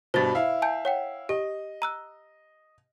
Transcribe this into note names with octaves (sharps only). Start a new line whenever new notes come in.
G2 B2 C5 A6
E4 F5
G#5 A5 G6
C#5 F#5 G5
G4 D#5
A#5 E6 F#6